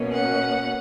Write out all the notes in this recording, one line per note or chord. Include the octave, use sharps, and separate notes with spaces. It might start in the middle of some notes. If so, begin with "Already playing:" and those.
Already playing: B2 A#3 C#4
F#5